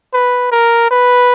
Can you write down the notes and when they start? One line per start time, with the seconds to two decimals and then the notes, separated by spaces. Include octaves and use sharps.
0.13 B4
0.52 A#4
0.91 B4